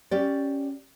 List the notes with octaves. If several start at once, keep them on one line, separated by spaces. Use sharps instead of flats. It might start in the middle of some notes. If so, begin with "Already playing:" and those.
C#4 G4 D5